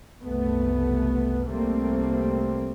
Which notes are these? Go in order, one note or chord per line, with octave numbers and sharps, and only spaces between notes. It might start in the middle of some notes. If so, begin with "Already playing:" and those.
F#1 C2 A3 B3
C2 G3 A3 A#3 C4